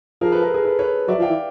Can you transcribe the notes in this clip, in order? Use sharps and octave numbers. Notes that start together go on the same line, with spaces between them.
F3 G#4 A#4
A4 B4
G#4 A#4
G#4 A#4
A4 B4
B4 C#5
F#3 D5 E5
F3
F5 G5
E3